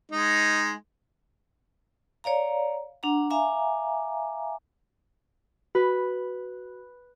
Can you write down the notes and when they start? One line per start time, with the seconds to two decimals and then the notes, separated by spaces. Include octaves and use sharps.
0.11 G#3 D#4
2.24 C#5 D5 F5 A#5
3.03 D4 F#5 A#5
3.30 E5 F5 G#5 A#5 D6
5.75 F#4 B4